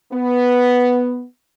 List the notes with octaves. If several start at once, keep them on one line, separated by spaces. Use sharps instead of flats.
B3